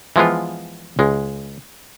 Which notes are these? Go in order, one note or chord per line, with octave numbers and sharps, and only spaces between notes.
E3 F3 G#3 B3 F4
C#2 G#3